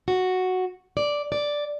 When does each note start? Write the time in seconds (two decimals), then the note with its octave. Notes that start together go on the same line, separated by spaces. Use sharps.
0.08 F#4
0.97 D5
1.32 D5